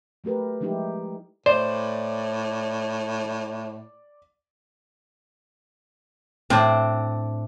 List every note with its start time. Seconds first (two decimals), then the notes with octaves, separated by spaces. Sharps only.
0.24 F#3 A3 G4 A#4 B4
0.61 F3 G3 G#3 D#4 E4 G4
1.46 A2 C5 D5
6.50 A2 C4 D4